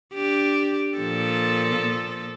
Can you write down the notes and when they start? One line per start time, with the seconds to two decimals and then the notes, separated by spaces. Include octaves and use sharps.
0.14 D4 G4
0.98 A#2 F3 A4